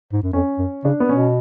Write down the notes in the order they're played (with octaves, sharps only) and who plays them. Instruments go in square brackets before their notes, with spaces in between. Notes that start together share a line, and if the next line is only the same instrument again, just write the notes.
[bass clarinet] G#2
F#2
[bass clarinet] F2 [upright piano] C#4
[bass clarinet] F#2
[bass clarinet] C#3 [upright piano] D4
[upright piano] B3
[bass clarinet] B2 [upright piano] C#4